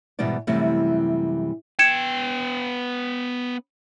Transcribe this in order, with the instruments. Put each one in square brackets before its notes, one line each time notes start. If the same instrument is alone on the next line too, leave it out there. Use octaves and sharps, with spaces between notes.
[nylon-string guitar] G#2 B2 E3 G3 B3 D5
F#2 C3 E3 G3 A3
[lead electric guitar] B3 G5 [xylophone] G#6 C#7 E7